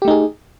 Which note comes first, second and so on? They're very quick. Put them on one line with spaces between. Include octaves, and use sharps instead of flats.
G4 A3 D#4 G#4